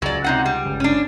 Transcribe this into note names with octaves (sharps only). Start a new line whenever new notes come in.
C#2 C#3 F#3 D5
C3 D#4 F#5
G3
G1 C#2 C#3
C#4 D4